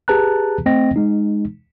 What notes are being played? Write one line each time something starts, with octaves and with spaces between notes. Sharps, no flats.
G4 G#4 B4 A5 A#5 F#6
A3 C4 D#5 G5 A#6
G#3 D#4